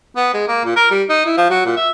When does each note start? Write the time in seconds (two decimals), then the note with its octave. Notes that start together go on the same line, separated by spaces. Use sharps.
0.16 B3
0.34 G#3
0.48 A#3
0.64 A#2
0.76 A#4
0.91 G3
1.09 D#4
1.26 E4
1.37 F3
1.50 F#3
1.65 A#2
1.76 E5